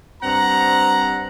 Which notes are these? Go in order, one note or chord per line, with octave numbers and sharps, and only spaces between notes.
G2 C4 F#5 A#5